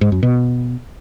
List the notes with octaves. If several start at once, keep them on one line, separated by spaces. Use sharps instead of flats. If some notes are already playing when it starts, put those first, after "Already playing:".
G#2
F#2
B2